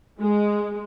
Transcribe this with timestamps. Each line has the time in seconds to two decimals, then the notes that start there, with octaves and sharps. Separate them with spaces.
0.20 G#3